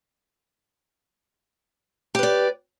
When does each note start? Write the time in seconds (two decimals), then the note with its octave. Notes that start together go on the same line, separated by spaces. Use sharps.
2.15 G4
2.19 B4
2.23 D5